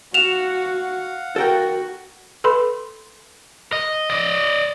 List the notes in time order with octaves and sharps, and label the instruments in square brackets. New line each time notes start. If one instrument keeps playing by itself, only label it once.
[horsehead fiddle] F#4 [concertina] F5 F#5 [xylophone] E7 F7
[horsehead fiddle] F#4 [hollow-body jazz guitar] A4 A#4 G5
[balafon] A4 B4 B5 C6
[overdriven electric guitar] D#5
D5 D#5